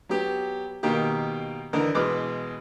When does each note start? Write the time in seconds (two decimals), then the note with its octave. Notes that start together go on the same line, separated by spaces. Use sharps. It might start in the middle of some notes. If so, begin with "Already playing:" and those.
0.09 F#3 B3 G4
0.83 B2 D#3 A#3 G4
1.73 D3 E3 D#4 A#4
1.94 B2 E3 G#3 B4 D6 F6